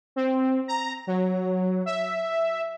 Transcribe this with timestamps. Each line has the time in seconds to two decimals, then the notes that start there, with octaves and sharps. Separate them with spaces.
0.16 C4
0.68 A#5
1.07 F#3
1.86 E5